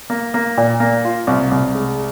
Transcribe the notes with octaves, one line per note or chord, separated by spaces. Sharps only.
A#3
A#3
A#2
A#3
F4
C2
C2
G#3